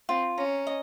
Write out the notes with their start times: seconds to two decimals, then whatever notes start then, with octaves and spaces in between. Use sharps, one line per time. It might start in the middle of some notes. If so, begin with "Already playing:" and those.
0.09 C4 F4
0.38 C#4 A#5
0.67 D#5